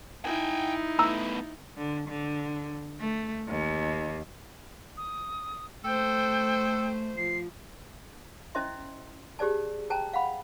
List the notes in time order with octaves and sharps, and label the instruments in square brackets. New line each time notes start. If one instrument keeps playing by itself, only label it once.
[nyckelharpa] D#4 E4 [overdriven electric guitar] G5 G#5
[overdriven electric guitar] A3 B3 [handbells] A#5 E6
[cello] D3
D3
A3
D#2
[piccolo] D#6
[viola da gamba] A3 C5 [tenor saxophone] A4 [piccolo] G5
[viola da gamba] F3 [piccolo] C7
[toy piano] C#4 E4 C5 D#5 E5 C6
G4 G#4 C5 D5 A5
C5 G5 A5 A#5
F5 F#5 B5